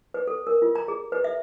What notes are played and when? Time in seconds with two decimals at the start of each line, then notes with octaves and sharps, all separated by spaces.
0.14 B4
0.27 A4
0.47 A#4
0.62 F4
0.75 A#5
0.88 G#4
1.12 B4
1.24 E5